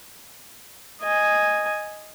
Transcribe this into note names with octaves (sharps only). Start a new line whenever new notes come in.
D#5 G#5